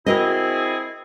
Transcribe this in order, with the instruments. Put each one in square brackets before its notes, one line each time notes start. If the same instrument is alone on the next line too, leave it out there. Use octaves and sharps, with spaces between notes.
[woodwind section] C4 E4 G#4 [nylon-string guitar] F#4 A#4 D#5